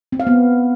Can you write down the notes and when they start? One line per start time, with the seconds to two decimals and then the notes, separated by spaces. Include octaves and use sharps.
0.12 C4
0.20 F5
0.27 B3